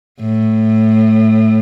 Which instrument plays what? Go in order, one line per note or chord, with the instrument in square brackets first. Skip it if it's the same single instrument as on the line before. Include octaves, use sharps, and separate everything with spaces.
[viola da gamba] A2